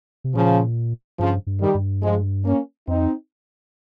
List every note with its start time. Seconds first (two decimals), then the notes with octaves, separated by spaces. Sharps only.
0.24 C3
0.34 A#2 C#3 F3
1.19 G2 C#3 F3
1.47 G2
1.61 D#3 G3
1.75 G2
2.03 F3 G#3
2.45 A#3 C#4
2.87 F2 C4 D#4